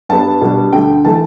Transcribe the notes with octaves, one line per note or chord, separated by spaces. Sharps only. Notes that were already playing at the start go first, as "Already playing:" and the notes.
G2 G3 B3 D4 A5
B2 G3 D4
D2 D3 A3 G5
E3 A3 A5